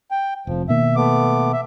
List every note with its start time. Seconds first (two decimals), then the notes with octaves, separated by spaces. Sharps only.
0.11 G5
0.47 F1 F2 F3
0.69 B2 D#3 A#3 E5
0.96 A3 B3 D6
1.53 E5